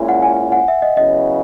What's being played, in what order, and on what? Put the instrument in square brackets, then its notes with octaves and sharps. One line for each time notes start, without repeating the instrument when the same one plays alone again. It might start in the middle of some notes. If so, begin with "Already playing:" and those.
Already playing: [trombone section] A#2 G#3 C#4 E4
[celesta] F#5
G#5
F#5
E5
D#5
[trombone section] C#3 F#3 B3 E4 [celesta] D#5